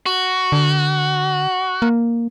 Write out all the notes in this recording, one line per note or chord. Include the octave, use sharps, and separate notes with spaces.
F#4
D3
A#3